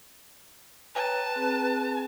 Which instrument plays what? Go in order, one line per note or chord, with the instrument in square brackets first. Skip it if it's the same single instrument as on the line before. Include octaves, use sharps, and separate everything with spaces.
[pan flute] B4 [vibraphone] C#5 G5 A#5 [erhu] A5
[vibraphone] C4 G#4 G5